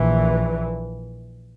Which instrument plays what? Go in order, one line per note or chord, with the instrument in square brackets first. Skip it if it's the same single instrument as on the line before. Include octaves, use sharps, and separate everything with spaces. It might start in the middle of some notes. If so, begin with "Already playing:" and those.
Already playing: [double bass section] A#1 A#2 E3